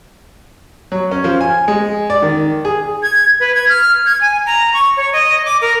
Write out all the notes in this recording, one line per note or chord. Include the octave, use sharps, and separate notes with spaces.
F#3
C#4
F3
G#5
G#3
D5
D#3
G#4
G#6
B4
G#6
F6
G#6
G#5
A#5
C#6
C#5
D#5
D6
A#4